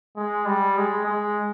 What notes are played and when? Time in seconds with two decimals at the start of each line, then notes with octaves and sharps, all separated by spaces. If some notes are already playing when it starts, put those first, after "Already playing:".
0.16 G#3
0.46 G3
0.77 G#3
1.06 G#3